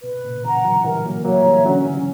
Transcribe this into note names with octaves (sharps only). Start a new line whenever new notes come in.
B2 B4
A#2 C#3
C#3 E3 F#5 A#5
D3 F#3
E3 G3 A#4
F#3 A#3
F#3 A#3 C#5 E5 A#5
E3 G3
D3 F#3 C#4
C#3 E3